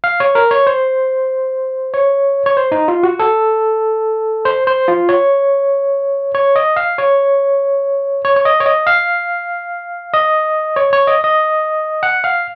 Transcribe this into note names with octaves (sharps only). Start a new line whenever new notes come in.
F5
C#5
A#4
C#5
C5
C#5
C#5
C5
D#4
F4
F#4
A4
C5
C5
F4
C#5
C#5
D#5
F5
C#5
C#5
C#5
D#5
C#5
D#5
F5
D#5
C#5
C#5
D#5
D#5
F#5
F5